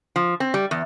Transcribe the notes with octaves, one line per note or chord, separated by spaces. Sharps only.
F3
C4
G3
E2